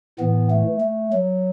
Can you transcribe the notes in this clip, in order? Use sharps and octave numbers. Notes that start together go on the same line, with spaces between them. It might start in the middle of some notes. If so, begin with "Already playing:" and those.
A2 E3 B3
A3
A3
F#3